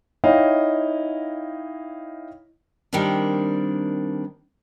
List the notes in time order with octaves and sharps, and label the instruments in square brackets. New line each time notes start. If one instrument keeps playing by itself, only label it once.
[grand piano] D#4 E4 C#5 D#5 F5 G5
[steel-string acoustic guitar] D#3 G3 A#3 C4 D4